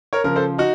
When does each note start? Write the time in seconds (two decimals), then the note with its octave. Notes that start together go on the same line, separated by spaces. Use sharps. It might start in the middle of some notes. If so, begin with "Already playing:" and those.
0.13 A#4 C#5
0.24 C#3 F3 A#4
0.36 A4 C5
0.58 D#4 F#4